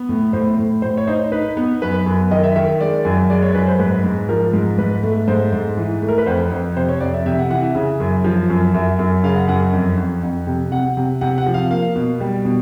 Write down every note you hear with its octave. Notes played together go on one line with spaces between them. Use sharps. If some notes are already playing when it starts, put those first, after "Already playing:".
Already playing: B3
A2
A2 C5
A2
A2 C5
C#5
D#4 C5
D#4 B4
B3
F#2 B4
F#2
D#3 D#5
E5
D#3 E5
G#3 D5
F#2
G#3 D5
C#5
F#2 B4
C5
G#2 B4
G#2
F3 A#4
G#2
G#2 B4
A3
G#2 C5
G#2
E3
A3
A#4
B4
F2 C5
F2
C3 C5
C#5
F2 D5
E5
C3 E5
F#5
E3 F#5
E5
C#3
F#2
F3
F#2
F#2 E5
F#2
C#3 F5
F#5
F#2 F#5
F2
F2
F2
C3
C3 F#5
C3
C3 F#5
F#5
F3
F5
A#3 F5
B2
G3
B2